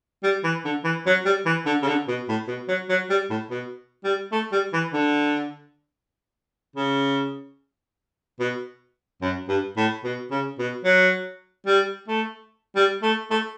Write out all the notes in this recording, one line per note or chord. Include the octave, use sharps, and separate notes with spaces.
G3
E3
D3
E3
F#3
G3
E3
D3
C#3
D3
B2
A2
B2
F#3
F#3
G3
A2
B2
G3
A3
G3
E3
D3
C#3
B2
F#2
G2
A2
B2
C#3
B2
F#3
G3
A3
G3
A3
A3